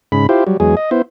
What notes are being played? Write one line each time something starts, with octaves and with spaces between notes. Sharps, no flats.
G#2 C#3 B5
E4 F4 G4 C5
F#3 G3
E2 F#3 G#3 G#4
D#5
B3 E4 C5